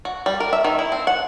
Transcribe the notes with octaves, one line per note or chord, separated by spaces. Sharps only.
F#4
G3
A#4
E5
D#3
E4
C4
F#5